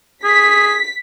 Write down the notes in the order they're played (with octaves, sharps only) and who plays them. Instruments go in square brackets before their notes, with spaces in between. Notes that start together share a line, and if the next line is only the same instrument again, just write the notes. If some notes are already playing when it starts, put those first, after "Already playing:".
[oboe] G#4 [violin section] B6